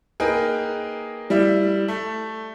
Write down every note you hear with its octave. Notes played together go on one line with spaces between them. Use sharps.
A#3 D#4 G#4 A#4 B4 G5
G3 E4 E5
A3